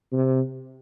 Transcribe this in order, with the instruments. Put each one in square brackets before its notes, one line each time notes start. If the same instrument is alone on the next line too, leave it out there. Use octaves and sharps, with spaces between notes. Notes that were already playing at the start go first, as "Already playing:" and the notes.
[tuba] C3